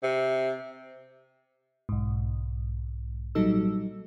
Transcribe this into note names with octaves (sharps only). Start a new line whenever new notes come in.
C3
B1 G#2
A#2 F#3 G3 D#4 A4 E6